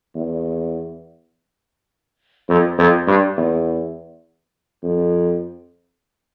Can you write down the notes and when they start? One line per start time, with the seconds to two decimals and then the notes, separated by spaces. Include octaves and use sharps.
0.15 E2
2.49 F2
2.78 F2
3.07 G2
3.37 E2
4.84 F2